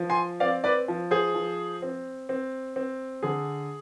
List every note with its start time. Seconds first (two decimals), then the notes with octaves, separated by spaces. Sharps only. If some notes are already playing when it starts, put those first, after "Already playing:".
Already playing: F3
0.10 G#5 C6
0.40 C4 D5 F5
0.64 B4 D5
0.88 F3
1.11 G#4 C5
1.35 F3
1.82 C4
2.29 C4
2.76 C4
3.23 D3 G#4